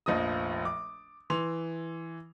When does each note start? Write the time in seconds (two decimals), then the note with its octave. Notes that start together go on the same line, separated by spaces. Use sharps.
0.06 F1 A#1 F3 D#5 D#6
0.65 D6
1.30 E3 C6 F7